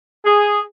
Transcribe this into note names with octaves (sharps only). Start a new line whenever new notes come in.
G#4